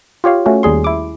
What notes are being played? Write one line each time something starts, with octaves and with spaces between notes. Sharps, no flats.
F4 G4 C#5 F5
A3 C#4 F#4
D#2 G3 G#4 C6
E4 D6